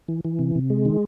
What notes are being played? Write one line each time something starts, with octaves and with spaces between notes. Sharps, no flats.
E3
E3
C3
C3
G#3
D#3